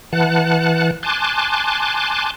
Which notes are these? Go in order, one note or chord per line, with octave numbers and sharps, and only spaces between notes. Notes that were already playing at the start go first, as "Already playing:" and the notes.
E3 F#5 A5 F#6
G#5 A5 C6 D6 F#6